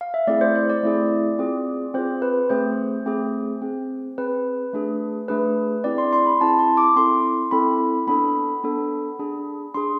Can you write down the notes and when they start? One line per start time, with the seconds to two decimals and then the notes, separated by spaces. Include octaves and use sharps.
0.01 F5
0.14 E5
0.27 A3 C4 E4 G#4 D5
0.41 C5
0.55 C5
0.70 D5
0.83 A3 C4 E4 G#4
1.39 C4 F4 G#4
1.94 C4 F4 G#4 C5
2.22 B4
2.50 A3 C4 G#4 C5
3.06 A3 C4 G#4
3.62 C4 G#4
4.18 C4 G#4 B4
4.73 A3 D4 G#4
5.28 A3 D4 G#4 B4
5.84 C4 E4 G#4 D5
5.98 C6
6.13 C6
6.26 B5
6.41 C4 E4 G#4 A5
6.59 C6
6.77 D6
6.96 C4 E4 A4 C6
7.51 C4 E4 A4 B5
8.07 B3 D4 A4 B5
8.64 B3 D4 A4
9.19 D4 G#4
9.74 D4 G#4 C6